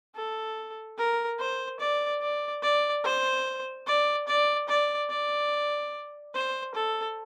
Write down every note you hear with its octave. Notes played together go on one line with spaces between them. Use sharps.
A4
A#4
C5
D5
D5
D5
C5
D5
D5
D5
D5
C5
A4